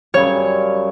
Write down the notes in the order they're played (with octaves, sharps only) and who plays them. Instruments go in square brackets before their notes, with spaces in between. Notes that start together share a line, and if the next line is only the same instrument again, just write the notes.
[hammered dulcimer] F#2 C#3 G3 [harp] C#5